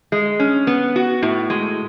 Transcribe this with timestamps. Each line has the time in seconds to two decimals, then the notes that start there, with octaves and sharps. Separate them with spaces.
0.12 G#3
0.40 C#4
0.67 B3
0.96 F#4
1.22 A2
1.50 G#3